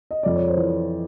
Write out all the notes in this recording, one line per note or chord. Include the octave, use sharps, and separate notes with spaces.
D#5
F2 D5
C#5
C5
E3